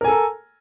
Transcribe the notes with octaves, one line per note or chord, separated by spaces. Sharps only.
A4 A#4 G#5 A#5